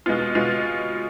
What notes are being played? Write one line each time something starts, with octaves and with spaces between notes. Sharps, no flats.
B2 G#3 B3 F4
B2 G#3 B3 F4